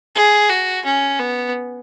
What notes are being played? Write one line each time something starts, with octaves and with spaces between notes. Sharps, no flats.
G#4
F#4
C#4
B3